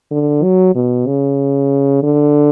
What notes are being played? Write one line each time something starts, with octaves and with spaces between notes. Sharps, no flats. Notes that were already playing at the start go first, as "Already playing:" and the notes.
D3
F#3
B2
C#3
D3